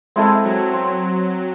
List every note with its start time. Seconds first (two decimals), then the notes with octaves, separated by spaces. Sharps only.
0.16 G#3 C4 E4 A4
0.44 F#3
0.73 C4